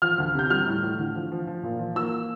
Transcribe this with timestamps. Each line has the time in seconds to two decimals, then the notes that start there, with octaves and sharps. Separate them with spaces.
0.02 F3 F6
0.18 D2
0.35 C3 G6
0.50 G3 F6
0.67 A2
0.83 A2
0.99 D3
1.15 F3
1.32 F3
1.47 F3
1.63 A#2
1.79 F3
1.96 A#3 E6